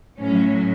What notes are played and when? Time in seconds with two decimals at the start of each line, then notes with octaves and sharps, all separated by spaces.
0.21 A2 F#3 C#4